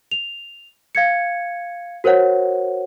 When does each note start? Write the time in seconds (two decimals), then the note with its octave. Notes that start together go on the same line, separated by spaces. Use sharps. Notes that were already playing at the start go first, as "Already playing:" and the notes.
0.11 F7
0.95 F5 G#6 C#7
2.04 F#4 A#4 C5 C#5 F#5